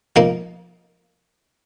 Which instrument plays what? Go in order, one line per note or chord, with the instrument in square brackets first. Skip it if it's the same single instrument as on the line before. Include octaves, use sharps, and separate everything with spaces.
[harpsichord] F3 A#3 D#4